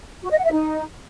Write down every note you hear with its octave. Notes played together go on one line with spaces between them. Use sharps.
F#4
D#5
F#5
E5
D#4